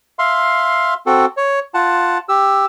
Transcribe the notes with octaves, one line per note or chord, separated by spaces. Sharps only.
E5 F5 C6
C4 F#4 A4
C#5
F4 F#5 A5
G4 E6